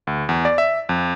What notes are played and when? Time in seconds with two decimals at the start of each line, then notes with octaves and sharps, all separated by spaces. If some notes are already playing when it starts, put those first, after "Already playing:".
0.07 D2
0.29 E2
0.45 D5
0.58 E5
0.89 F2